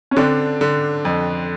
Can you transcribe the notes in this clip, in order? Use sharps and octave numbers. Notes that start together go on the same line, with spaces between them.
C#4
D3 C4 D4
D3
F2